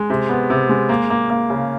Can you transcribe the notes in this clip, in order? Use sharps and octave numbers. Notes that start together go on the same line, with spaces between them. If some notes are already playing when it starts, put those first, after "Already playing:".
Already playing: G#3
C3
B3
C3
G#3
A#3
A#3
A#3
C#3